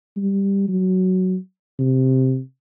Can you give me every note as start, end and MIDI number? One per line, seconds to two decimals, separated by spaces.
0.16 0.67 55
0.68 1.37 54
1.79 2.40 48